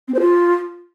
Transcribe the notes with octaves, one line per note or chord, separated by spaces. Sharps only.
C4
C5
F4